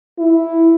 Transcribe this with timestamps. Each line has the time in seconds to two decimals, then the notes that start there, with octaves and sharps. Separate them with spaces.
0.19 E4